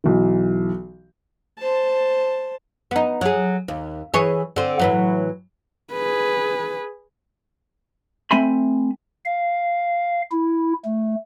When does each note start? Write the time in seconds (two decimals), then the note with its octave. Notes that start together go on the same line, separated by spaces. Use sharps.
0.04 B1 E3
1.59 C5 A5
2.91 B3 D#4
3.21 F#3 G#4
3.68 D#2
4.14 E3 G#4 C#5
4.56 D3 C4
4.79 A2 E3 F#3
5.93 G#4 B4
8.31 A3 C4 E5 G#5 B5 C6
9.25 F5
10.32 E4
10.85 A3